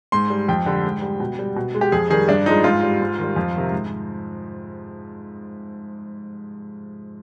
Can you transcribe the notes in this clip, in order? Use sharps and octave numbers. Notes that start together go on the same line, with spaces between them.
G#2 C6
G3
F2 G5
D3 G3
G#2
G3
B2
G3
B2
G#3
G4
F2 G#4
D#3 G3 G#4
G2 D4
F3 G#3 D#4
G#2 F4
G3
G#2
D#3 G3
F2
C3 D#3
G#2